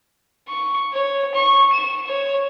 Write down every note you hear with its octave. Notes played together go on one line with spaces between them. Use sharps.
C#6
C#5
C#6
E7
C#5